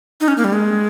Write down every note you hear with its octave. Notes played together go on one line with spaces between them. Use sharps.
D#4
C#4
A#3
G3
G#3